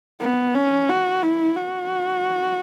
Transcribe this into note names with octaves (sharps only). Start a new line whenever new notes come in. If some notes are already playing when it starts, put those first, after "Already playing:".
B3
C#4
F#4
E4
F#4